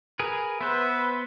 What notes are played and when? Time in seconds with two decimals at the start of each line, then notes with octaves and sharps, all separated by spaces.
0.19 G#4 A#4 B4
0.61 B3 B4 C5 E5